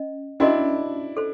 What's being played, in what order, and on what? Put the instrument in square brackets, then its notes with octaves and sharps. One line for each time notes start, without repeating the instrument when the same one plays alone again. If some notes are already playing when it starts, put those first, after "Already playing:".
Already playing: [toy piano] C#4 D#5
[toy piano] C#4 F#4 A#4 D#5 [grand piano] D4 E4
[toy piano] A4 C5